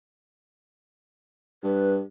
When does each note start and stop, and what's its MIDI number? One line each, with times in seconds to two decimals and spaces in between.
1.64 2.03 43
1.64 1.93 71